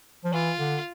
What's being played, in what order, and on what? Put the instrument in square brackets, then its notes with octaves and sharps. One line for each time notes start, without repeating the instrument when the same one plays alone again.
[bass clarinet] F3
[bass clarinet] E3 [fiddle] F4
[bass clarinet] D3